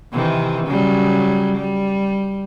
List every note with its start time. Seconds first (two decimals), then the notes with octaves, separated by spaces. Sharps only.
0.13 C3 D#3 E3
0.66 C#3 F#3 G3
1.58 G3